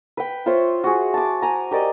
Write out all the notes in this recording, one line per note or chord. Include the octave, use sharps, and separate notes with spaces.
B4 G5
F4 C5 C#5 E5
F#4 G#4
A5 D6
G#5 A#5
G4 A#4 D5 D#5